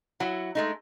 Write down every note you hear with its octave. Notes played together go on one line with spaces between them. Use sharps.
F#3 E4 F#5
G#3 A3 D#4